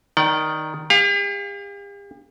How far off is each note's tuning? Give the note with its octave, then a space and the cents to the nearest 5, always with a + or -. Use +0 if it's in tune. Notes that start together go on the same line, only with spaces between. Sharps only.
D#3 +0 D5 +0 G5 -40
G4 +45 F5 +20